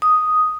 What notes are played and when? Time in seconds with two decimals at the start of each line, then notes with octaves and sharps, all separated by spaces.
0.02 D#6